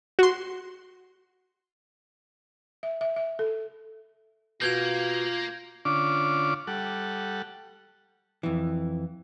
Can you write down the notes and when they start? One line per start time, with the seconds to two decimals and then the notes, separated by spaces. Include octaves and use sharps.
0.19 F#4 C6
2.83 E5
3.01 E5
3.16 E5
3.39 A4
4.62 B2 A#3 F4 G6 G#6 F7
5.85 D3 C#4 D4 F4 D6
6.67 G3 A4 F#5
8.43 F2 E3